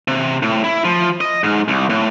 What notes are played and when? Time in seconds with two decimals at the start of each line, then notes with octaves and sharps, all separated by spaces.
0.08 C3
0.43 A2
0.64 E4
0.85 F3
1.21 D#5
1.44 G#2
1.68 C2
1.90 A2